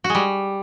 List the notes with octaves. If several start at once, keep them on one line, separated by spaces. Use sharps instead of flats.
F#4
G#3
G3